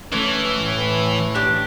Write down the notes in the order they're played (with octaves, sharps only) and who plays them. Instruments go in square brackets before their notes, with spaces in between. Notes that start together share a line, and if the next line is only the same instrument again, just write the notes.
[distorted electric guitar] E3 [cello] A3 [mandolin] C#4
[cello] A2
[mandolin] D4 G4